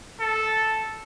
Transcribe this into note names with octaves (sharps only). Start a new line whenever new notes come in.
A4